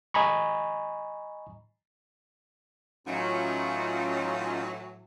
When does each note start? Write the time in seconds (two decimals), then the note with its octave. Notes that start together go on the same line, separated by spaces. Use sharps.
0.14 D#5 G#5 A#5 B5 C#6
3.07 A2 E3 F#3 C#4 D#4 F4